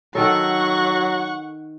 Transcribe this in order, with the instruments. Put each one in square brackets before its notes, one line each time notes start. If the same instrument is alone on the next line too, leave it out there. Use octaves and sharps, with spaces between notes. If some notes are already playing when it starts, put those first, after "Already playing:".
[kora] D#3 A4 [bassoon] F#3 [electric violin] F#5 C#6